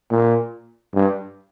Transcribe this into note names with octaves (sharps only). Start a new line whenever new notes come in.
A#2
G2